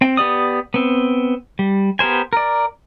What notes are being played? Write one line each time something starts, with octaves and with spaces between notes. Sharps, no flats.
C4 G5
B3 G4 D5 D#6
B3 C4
G3
B3 G4 A#4 C5 G#5
A#4 D5